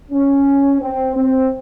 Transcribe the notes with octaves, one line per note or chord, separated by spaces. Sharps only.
C#4
C4
C4